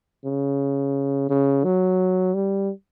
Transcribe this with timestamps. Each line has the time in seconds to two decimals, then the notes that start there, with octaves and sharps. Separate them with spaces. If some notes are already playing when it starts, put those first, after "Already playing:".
0.25 C#3
1.29 C#3
1.64 F#3
2.34 G3